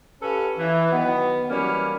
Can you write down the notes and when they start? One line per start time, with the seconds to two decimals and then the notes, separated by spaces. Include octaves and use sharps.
0.22 C#4 G4 A4 B4 F5
0.58 E3
0.91 D#3 F#3 B3
1.49 E3 F#3 G3 A#3 C#4